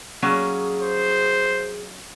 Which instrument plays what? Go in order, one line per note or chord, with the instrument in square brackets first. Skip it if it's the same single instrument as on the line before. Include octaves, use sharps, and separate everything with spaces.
[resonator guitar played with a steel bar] F#3 A#3 C#4 [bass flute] G#4
[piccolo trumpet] C5